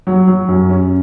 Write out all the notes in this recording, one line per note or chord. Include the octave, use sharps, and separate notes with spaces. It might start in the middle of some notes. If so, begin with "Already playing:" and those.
F#3
F#3
F#2
C#4